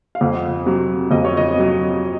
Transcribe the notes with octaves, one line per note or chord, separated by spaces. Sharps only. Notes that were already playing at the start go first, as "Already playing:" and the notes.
F5
F2 F#5
C3 F#3
F2 D#5
C#5
D#5
C3 F#3